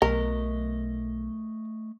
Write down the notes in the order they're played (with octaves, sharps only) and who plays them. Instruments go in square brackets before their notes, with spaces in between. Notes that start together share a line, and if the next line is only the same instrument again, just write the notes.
[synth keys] B1 [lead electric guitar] A3 D#5 [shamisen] A#4